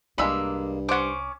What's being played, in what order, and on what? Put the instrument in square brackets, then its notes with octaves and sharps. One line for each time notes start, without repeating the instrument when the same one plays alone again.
[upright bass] C2 C3 [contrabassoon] G2 [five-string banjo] G#3 A#3 D4 [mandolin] B5 E6
[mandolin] C#4 D6 [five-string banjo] C5 F#5